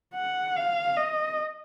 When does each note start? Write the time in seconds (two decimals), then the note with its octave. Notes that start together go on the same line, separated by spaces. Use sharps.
0.15 F#5
0.56 F5
0.96 D#5